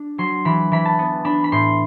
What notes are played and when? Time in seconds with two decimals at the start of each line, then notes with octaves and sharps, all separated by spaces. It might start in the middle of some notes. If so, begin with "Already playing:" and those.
Already playing: D4
0.18 F#3 C6
0.45 E3 B5
0.72 E3 B5
0.85 A5
0.99 B3
1.25 D4 B5
1.44 B5
1.52 A2 C6